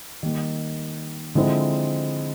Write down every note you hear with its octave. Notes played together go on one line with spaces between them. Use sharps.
D#3 G3 A#3
D3 F3 G#3 C4 E4